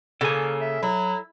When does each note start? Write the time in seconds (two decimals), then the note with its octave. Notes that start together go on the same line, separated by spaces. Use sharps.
0.21 C#3 A#3 A4 G#5
0.61 E5
0.83 F#3 E4